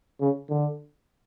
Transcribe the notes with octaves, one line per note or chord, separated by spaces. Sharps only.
C#3
D3